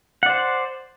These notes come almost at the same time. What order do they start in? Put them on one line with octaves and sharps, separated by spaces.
F#5 D5 C5